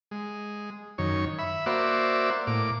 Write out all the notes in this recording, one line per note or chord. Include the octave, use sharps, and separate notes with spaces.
G#3
F#2 D#3 C#5
E5 B5
A#3 F#4 C5 D5 E5
A2 A#3 D6